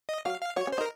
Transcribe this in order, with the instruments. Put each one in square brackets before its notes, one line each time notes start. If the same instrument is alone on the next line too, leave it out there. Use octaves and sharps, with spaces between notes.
[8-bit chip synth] D#5
[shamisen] F#3 [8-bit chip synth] F5
[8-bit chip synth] F5
[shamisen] F#3 [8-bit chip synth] C#5
[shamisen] C#4
[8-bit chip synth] C5
[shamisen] D#4
[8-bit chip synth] A#4